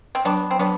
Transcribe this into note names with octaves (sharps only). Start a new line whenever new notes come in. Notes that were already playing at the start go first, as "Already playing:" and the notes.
C4
F#3 B3 D4
C4
F#3 B3 D4